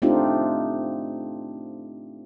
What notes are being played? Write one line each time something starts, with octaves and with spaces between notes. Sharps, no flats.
A3 C4 D4 D#4 F4 G4